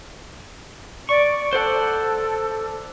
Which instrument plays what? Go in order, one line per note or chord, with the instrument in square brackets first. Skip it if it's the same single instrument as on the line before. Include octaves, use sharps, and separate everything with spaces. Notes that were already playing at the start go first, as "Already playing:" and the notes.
[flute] D5 [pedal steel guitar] C#6
[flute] A4 [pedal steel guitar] C5 D5 F#5